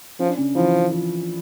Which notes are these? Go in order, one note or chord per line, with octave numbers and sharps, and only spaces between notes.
F3 C#4
D4
C#3 C#4
E3 F3 E4
F3 F4